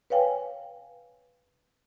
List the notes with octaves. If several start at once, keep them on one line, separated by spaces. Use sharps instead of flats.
B4 C#5 F5 G5 G#5